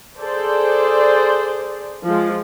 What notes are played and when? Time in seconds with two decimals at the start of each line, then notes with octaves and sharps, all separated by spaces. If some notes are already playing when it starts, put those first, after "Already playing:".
0.18 G#4 A4 C5 D5
2.05 F3 G#3